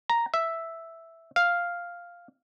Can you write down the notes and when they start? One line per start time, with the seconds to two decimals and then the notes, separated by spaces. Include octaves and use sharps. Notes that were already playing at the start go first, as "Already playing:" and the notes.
0.10 A#5
0.34 E5
1.36 F5